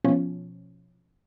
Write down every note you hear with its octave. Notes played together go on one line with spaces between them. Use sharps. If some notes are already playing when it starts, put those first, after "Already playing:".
B2 F3 C#4